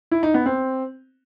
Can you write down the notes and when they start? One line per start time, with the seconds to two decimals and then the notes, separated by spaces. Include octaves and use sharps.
0.11 E4
0.23 D#4
0.34 B3
0.46 C4